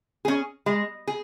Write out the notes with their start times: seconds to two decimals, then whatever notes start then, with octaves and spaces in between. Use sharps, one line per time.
0.25 C#4 G#4
0.66 G#3
1.07 G#4